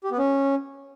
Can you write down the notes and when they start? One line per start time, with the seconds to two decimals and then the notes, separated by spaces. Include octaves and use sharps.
0.04 G4
0.11 B3
0.18 C#4